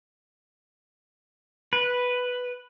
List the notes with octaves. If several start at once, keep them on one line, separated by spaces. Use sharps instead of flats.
B4